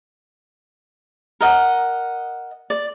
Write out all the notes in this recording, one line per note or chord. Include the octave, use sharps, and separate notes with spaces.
A#4 D#5 F#5
D5